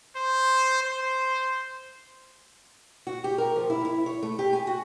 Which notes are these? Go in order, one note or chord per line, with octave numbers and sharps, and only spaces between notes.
C5
C5
F#4
G4
A#4
F3
E4
E4
C#5
A3
G4
G#5
F#4